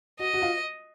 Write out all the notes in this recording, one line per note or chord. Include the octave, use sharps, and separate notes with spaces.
F#4 D#5
F#4
F4